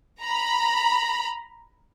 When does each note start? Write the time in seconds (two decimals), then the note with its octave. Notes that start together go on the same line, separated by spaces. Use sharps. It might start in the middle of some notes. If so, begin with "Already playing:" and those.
0.22 A#5 B5